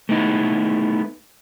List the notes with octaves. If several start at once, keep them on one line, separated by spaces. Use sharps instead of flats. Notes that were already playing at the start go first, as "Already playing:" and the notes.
A3 B3 D#4 E4